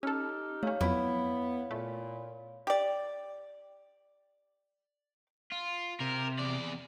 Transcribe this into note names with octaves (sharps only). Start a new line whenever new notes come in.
C#4 D#4 G4 A4 E6 F6
A3 C#4 C#5 F5
F2 F#3 B3 E4
A#2 A3
G4 D5
F4
C3 A#4
E2 D5